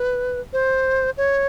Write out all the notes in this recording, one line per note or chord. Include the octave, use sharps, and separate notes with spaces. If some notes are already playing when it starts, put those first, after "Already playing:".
Already playing: B4
C5
C#5